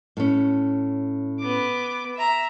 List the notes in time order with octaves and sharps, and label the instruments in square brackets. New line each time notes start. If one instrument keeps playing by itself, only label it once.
[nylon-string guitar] A2 C#4
[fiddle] B3 D6
E5 A#5